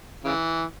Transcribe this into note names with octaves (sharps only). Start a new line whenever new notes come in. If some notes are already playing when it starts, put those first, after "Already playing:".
C#3 E3